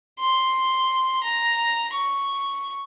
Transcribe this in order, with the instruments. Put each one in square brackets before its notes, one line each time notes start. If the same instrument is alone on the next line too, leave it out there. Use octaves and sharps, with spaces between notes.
[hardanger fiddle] C6
A#5
C#6